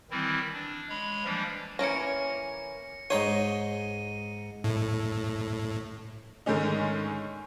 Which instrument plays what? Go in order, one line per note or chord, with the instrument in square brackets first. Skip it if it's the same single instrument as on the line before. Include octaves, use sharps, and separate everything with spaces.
[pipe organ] D#3 E3 G3 C4 E4
D4
G#3 C#5 B5
E3 F3 G3 A#3 D4
[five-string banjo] E3 A#3 C#4 [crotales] A#6 C#7
[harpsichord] G#2 D#5 C6 [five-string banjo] D#4 C#5 [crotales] D#7
[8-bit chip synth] A2
[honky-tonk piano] G#2 D3 D#3 G#3 C#4 D#4